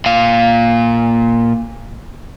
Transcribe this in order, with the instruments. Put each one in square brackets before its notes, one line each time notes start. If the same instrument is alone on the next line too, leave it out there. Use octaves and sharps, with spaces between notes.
[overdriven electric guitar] A#2 F5